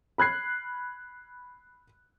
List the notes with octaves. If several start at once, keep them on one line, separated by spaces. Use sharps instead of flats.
B5 F#6 G#6 C7